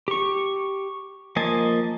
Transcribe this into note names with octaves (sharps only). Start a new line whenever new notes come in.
G4 C#6
F3 A#3 D#5 G#5 A5